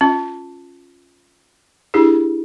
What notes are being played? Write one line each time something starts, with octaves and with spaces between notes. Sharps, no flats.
C#4 F4
D4 E4 G4 G#4